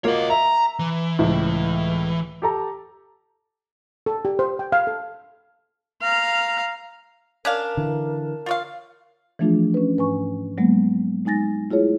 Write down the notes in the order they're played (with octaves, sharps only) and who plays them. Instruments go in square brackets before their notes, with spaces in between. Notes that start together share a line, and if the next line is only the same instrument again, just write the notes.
[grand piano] A#3 F4 F#4 [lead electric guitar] C#5 D#5
[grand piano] E5 [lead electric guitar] A#5
[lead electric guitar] E3
[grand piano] C#2 A2
G4 A4 A#5
[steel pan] A4
G4
C5
G5
F5
A4
[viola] F5 A#5
[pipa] C#4 D4 F5 [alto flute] A#4
[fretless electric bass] D3 E3
[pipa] F4 C#5 F5
[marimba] E3 F3 A3 D4 F4 G#4
C#4 B4
G#2 B4 G#5 C#6
F#3 G#3 A#3 B3
G#3 D#4 G#5 A6 A#6
A3 E4 F4 G#4 C#5